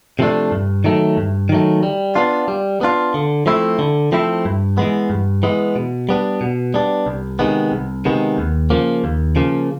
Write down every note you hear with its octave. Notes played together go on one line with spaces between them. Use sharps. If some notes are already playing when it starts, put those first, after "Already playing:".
C3 F3 A3 D4
G2
D#3 F#3 A3
G2
D#3 F#3 A3
G3
B3 D4 F4
G3
B3 D4 F4
D3
F3 A3 C4 E4
D3
F3 A3 C4 E4
G2
E3 G#3 B3
G2
E3 G#3 B3
B2
G3 B3 D4
B2
G3 B3 D4
C2
C3 D#3 G#3 B3
C2
C3 D#3 G#3 B3
D#2
C#3 F3 A#3
D#2
C#3 F3 A#3